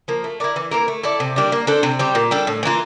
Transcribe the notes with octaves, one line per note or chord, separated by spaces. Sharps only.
F3 A#3
A3
E4 A#4 D5
E3
A#3 E4 A#4
A3
E4 A4 D5
C3
G3 A#3 D4
A#3
D4 A4 C5
C3
G3 C4 G4
A#2
G3 D4 A4
A2
E3 A#3 F4